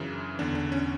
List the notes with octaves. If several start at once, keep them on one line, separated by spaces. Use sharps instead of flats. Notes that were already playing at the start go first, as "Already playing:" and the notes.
Already playing: F#2 C#3 E3 D4
E2 D3 D4
D4
C#4